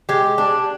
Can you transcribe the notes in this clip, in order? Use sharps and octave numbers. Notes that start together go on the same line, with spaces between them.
G#3 G4
D4